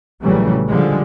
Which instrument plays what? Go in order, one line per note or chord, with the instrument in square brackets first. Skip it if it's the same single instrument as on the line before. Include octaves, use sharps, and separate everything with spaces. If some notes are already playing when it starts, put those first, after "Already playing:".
[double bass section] A#1 C#3 E3 F#3 G3 A3
D3 F3 G3 G#3